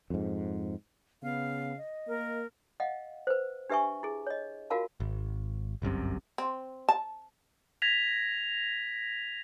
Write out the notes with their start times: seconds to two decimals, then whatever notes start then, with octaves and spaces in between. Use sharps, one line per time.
0.10 F2 G#2
1.23 C#3 B3 F5
1.77 D#5
2.08 A#3 A#4
2.80 D#5 F5 F#5
3.27 B4 C5
3.69 D4 G4 B4 E5 G#5 C#6
4.03 E4 G#4
4.27 C#5 D#5
4.70 F4 F#4 A#4 F5 A5
5.00 G#1
5.82 G1 C2 F#2 C3
6.38 C4
6.89 A5
7.82 G#6 A#6 B6 F7